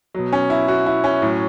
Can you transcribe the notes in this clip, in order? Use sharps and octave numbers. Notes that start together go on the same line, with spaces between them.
B2 F#3
C#4
E4
F#4
E4
C#4
A2 F#3